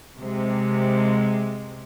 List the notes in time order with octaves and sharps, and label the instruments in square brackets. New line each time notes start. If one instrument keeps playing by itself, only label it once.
[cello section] C3 G#3